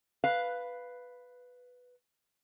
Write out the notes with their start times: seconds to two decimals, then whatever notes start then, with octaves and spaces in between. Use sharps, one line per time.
0.24 B4 F5